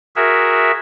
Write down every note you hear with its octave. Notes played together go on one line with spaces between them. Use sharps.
F#4 G#4 A#4 E5